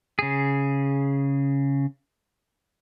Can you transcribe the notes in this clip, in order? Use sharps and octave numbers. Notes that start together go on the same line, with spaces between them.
C#3 G#4